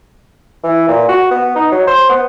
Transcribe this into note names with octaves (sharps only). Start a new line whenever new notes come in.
E3
A#2
F#4
B3
D#4
F#3
C5
B3